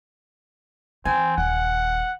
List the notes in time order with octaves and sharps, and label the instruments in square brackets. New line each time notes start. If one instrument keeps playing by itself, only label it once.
[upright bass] E3 [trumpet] C4 [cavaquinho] G#5
[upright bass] D#1 [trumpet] F#5